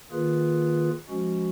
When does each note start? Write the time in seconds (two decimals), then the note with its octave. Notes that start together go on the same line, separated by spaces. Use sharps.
0.11 D#3 A#3 F4 G#4 B4
1.09 F3 G#3 C#4 F#4